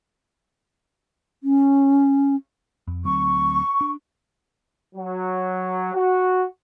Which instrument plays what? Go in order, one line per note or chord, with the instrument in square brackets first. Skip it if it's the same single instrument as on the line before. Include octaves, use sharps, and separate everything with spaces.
[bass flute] C#4
[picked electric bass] F2
[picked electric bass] D2 F#3 C4 [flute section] C#6
[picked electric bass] D4
[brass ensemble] F#3
F#4